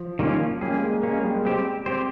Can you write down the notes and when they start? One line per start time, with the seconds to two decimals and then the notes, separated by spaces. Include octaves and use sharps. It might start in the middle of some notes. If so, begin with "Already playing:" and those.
Already playing: F3
0.19 D#3 G3 A#3 C#4 F4
0.61 G3 A#3 C#4 G#4
0.72 G#3
0.82 G#3
0.92 A#3
1.03 G#3 A#3 C#4 G#4
1.13 G#3
1.24 G3
1.34 G#3
1.45 G3 C4 G4 C5
1.86 C4 G4 C5